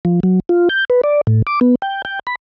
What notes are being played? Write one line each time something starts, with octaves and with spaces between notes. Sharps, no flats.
F3
F#3
F4
G6
B4
D5
A2
D6
B3
G5
G5
B5